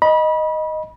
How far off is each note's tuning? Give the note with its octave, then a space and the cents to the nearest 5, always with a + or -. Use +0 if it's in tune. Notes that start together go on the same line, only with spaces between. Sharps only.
D#5 +0 B5 -30